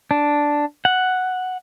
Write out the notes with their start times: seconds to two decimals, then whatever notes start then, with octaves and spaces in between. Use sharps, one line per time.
0.11 D4
0.85 F#5